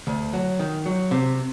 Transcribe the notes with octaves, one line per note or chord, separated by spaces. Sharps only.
D2
F#3
D#3
F#3
C3